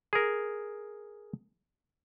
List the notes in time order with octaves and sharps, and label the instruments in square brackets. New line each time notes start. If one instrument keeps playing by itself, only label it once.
[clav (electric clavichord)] G#4 A#4